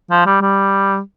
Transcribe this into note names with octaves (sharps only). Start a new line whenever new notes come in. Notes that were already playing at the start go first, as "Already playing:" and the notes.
F3
G3
G3